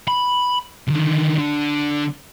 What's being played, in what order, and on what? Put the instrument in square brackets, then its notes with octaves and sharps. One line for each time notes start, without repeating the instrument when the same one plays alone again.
[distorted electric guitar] B5
D3 D#3
D3